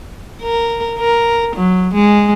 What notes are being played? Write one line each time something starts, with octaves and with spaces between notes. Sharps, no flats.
A#4
A#4
F#3
G#3